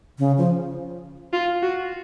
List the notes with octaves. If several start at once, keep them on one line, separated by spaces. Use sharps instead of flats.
C#3
F3
F4
F#4